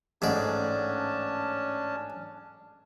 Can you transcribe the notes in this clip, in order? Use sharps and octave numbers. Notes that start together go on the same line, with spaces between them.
A1 G#2 C#4 D4 D5 A5